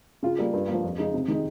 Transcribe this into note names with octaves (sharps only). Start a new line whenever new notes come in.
C#3 F4
G3 A#3
G2
F3 A#3
F2
C#3 G#3 D#4
C3
D#3 G#3 D#4